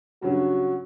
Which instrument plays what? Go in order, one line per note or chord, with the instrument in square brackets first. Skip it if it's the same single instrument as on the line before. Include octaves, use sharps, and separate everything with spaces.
[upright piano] G2 C#3 F#3 [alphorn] F#4